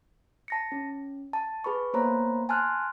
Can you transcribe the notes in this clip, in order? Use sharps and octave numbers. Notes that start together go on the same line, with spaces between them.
A5 A#6 C#7
C#4
A5
G#4 B4 B5 C#6
A#3 B3 C5 C#5 A#5 B5
G#5 A5 C6 F6 F#6